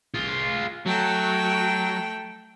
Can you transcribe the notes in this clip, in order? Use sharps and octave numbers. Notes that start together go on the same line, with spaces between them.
F4 G#4
F#3 A3 G5